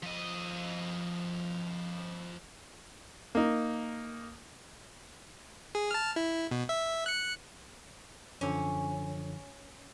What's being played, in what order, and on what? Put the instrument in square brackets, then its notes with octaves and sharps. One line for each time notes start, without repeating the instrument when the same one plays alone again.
[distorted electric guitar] F3 D#5
[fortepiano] A#3 D#4
[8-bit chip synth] G#4
A5 F6
E4
B2
E5
F#6 C#7
[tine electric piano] F#2 D3 F3 [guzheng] C#4